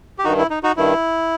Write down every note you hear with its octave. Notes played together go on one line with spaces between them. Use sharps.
G4
G2 D#3 D#4 F#4
E4
D#4
D#4 F#4
G2 D#3 E4